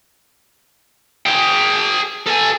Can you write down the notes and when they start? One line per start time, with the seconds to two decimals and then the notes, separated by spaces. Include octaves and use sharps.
1.26 G#4 G5
2.26 A4 G#5